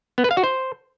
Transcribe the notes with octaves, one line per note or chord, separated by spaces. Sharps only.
B3
B4
F5
F#4
C5